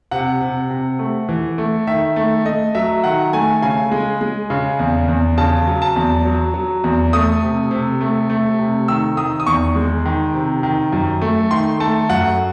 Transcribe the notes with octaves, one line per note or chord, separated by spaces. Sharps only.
C3 F#5
C3
C3
A3
E3
A3
D#3 E5
A3
A3 D#5
F#3 E5
D#3 F#5
A3 G#5
C#3 G#5
G#3
G#3
C#3
E2
E2
C#3 A5
F#3
A5
E2
F#3
F#3
E2
A3 D#6
C3
C3
A3
A3
C3
D#3 E6
D#3 D#6
D#6
E2 C#6
G#3
D#3
C3
D#3
F#2
A3
D#3 C6
A3 A5
F#2 F#5